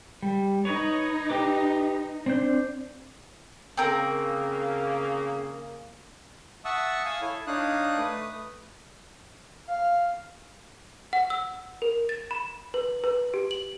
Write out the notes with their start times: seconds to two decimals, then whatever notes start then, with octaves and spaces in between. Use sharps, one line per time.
0.22 G3
0.65 D#4 B4 C#5
1.30 G4 B4 D6
2.26 C4 D4 G6
3.77 C#3 A#3 C4 A#4
6.65 E5 F#5 A5 C#6 D#6 E6
7.05 F5 G#5 D#6 E6
7.21 E4 A4 C#5
7.47 D4 D#4 C#5 F5 D#6 F#6
7.98 A3 B4 D#6
9.68 F5
11.13 F#5
11.30 E6
11.82 A#4
12.09 A6
12.31 B5
12.74 B4
13.04 B4
13.34 G4
13.51 F#7